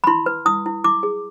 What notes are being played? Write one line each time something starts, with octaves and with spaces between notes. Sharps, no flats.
B5
E4 C6
B4
E4 D#6
E4
E4 D6
G#4